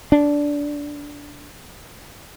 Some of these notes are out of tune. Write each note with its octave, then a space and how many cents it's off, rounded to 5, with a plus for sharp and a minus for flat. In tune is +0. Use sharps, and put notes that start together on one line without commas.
D4 -15